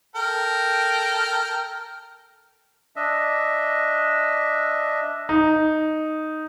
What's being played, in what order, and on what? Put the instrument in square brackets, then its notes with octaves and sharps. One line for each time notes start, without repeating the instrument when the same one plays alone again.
[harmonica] A4 A#4 G5
[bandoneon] D4 D#5 E5
[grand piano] D#4